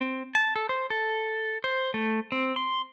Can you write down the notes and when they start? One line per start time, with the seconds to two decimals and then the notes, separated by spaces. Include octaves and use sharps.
0.01 C4
0.35 A5
0.56 A4
0.69 C5
0.90 A4
1.64 C5
1.94 A3
2.32 C4
2.56 C6